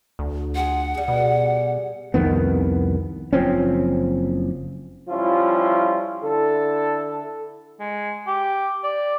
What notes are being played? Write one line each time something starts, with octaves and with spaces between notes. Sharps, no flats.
D2
F4 G4 G#4 F#5
G3 G#4
B2
C2 F2 D#3 B3
F#1 F3 C4 C#4
F3 G3 C#4 E4 F4
D3 E4 A4
G#3
G4
D5